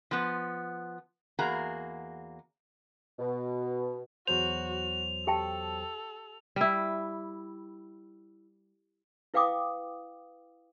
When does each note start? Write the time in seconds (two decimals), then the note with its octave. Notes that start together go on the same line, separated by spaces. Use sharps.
0.11 F3 B3
1.39 E2 A#3 F#4 G#4 A#5
3.19 B2
4.27 E2 F#3 F#4 C5 F7
5.27 G4 A4 G5 A5
6.56 G3 E4
9.34 E4 B4 F5 G5 D6 D#6